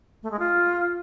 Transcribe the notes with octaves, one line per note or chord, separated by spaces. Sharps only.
A3
G#3
F4